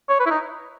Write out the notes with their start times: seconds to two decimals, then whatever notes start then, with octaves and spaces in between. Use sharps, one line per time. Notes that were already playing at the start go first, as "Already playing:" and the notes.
0.09 C#5
0.20 B4
0.26 E4
0.30 D#4